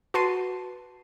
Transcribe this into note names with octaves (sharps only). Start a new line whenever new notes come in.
F#4 B4 A5 C6 C7 D#7